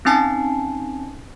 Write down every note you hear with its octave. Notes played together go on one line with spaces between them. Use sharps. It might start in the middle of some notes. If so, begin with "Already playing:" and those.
C4 C#4 D#4 G#5 A5 C7